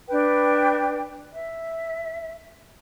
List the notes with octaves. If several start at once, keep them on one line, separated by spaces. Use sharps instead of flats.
D4 B4 G5
E5